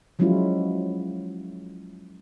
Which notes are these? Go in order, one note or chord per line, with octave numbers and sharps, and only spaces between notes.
F3 F#3 G#3 C#4 E4 F4